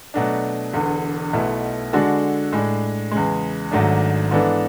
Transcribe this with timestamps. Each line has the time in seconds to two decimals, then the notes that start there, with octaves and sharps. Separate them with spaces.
0.14 B2 F#3 A3 D4
0.74 E1 E2 D3
1.33 B1 B2 A3 E4
1.93 D3 G#3 D4 F#4 A4
2.52 A2 G#3 D4
3.11 E2 C#3 G#3
3.71 G#1 G#2 F#3 A3 D4
4.31 G#2 E3 B3 D4 A4